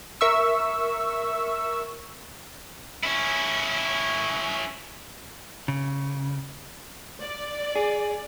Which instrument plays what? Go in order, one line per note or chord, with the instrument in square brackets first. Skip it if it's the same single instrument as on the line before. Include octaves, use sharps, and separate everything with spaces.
[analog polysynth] A#4 E5 C#6 E6
[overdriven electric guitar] C#4 E4
[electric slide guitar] C#3
[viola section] D5
[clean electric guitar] G#4